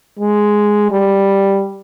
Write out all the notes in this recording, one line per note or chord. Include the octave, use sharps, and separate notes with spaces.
G#3
G3